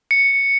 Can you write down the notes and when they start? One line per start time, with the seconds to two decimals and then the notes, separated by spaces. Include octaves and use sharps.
0.11 C#7